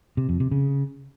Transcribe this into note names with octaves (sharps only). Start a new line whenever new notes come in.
C3
F2
C3
C#3